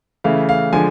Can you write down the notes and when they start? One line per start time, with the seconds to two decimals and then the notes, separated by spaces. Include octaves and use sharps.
0.24 C#3 E3 A3 F5
0.49 F5
0.73 D3 F3 G#3 G#5